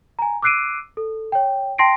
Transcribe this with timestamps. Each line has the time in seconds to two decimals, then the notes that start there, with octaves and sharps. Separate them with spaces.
0.19 G#5 A#5
0.42 D6 E6 F#6 C7 D7 D#7
0.97 A4
1.32 C#5 G5
1.78 G5 A5 C6 A#6 C7 D7